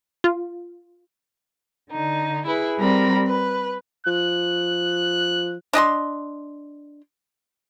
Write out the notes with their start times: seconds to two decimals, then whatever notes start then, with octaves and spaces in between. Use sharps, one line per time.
0.24 F4
1.90 D3 D#4
2.46 E4 G#4 B4
2.78 G3 C4 A#4 B5 A#6
3.26 B4
4.07 F3 F#6
5.73 D4 D#5 A5 C6